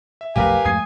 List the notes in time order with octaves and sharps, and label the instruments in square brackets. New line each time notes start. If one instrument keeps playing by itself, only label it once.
[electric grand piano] E5
[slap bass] B1 F2 A3 [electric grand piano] G4 A#4 B4 [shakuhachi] F5 [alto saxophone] G#5
[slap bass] F2 G#2 A3 [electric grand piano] D#6 G#6 C7